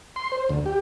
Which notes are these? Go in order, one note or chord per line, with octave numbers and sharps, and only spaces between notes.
C6
C5
D2
G4